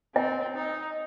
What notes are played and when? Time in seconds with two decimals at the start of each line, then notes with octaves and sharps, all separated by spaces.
0.15 C4 D#5 G5
0.55 D#4